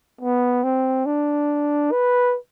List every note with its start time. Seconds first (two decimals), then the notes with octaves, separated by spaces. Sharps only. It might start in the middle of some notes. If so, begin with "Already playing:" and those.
0.21 B3
0.64 C4
1.06 D4
1.92 B4